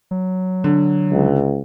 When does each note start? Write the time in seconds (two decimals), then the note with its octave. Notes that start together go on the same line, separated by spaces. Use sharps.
0.11 F#3
0.64 D3
1.12 C#2